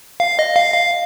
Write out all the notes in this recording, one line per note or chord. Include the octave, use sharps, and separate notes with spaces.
F5
D#5
F5
F5